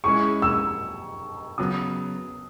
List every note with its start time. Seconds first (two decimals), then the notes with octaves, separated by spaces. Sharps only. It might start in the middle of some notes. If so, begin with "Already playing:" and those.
0.04 G#3 C#4 E4 G#4 C#6
0.42 E6
1.58 C#3 F#3 B3 D#6